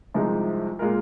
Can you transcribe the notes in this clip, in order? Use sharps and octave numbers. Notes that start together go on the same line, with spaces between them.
C2 C3 F3 G#3 D#4
A#2 G#3 F4 A#4